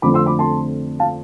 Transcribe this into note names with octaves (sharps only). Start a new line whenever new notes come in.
F2 D3 A3 C4 B5 D6
C6 E6
B5 D6
A5 C6
F5 A5